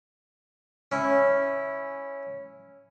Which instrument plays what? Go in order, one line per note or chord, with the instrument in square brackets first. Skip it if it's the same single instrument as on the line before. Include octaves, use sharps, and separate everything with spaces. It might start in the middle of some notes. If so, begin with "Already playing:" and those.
[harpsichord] C#4 E4